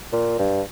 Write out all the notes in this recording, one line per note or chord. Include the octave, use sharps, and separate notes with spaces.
A#2
G2